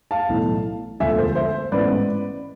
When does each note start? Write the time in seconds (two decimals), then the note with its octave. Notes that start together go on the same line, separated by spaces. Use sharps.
0.11 F5 A5
0.29 B1 A2 E3
1.00 E1 D2 D3 F3 E5 G#5
1.18 A4 C5
1.35 C5 E5
1.72 A1 G#2 E3 B3 E4 B4 D5